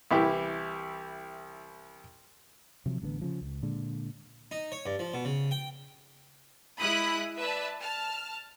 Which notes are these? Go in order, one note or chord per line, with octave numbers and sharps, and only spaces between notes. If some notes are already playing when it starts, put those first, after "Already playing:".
C2 E3 E4 G4
C3 F3 F#3
A1 D3 G3 B3
C#3 F3
C#2
A#2 D3 G#3
D#4
C#5
G2
F3
B2
C#3
G5
G#3 E4 B5 D#6 F#6
B4 D5 E5 A5
A5 F6